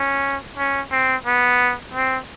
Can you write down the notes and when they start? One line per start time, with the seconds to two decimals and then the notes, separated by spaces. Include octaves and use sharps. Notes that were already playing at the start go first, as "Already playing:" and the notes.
Already playing: C#4
0.57 C#4
0.92 C4
1.26 B3
1.94 C4